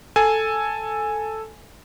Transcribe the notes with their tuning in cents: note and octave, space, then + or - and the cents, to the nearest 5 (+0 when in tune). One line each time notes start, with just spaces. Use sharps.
A4 +0 G#5 +0